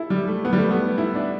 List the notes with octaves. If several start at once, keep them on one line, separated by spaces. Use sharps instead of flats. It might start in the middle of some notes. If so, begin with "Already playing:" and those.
Already playing: E4 G4 A4
G3
A3
B3
G3
A3
B3
E4
D4